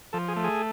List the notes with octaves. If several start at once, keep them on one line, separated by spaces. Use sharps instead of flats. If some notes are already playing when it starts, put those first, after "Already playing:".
F3 A4
G#4
A3
G#4